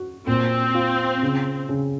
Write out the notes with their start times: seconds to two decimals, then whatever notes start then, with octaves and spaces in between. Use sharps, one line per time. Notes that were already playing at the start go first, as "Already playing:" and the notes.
Already playing: F#4
0.27 A#2 C4
0.75 F4
1.23 C#3
1.69 C#3